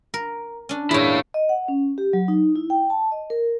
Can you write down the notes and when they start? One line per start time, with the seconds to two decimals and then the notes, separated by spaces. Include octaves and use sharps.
0.14 A#4
0.69 C#4 D4
0.91 E2 A#2 E4 C#5
1.34 D#5
1.49 F#5
1.68 C#4
1.98 G4
2.13 F#3
2.28 D#4
2.56 E4
2.70 G5
2.90 A5
3.12 D#5
3.30 A#4